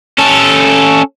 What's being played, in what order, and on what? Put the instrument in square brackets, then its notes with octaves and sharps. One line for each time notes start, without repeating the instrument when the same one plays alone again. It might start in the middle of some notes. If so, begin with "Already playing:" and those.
[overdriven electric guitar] C#4 A4